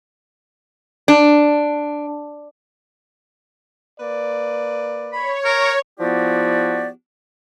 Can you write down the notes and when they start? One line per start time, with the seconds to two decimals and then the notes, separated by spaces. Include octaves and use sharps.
1.08 D4
3.99 A#3 B4 D5
5.12 C#5 B5
5.45 A#4
6.00 F3 B3 E4 F#4 G4 D5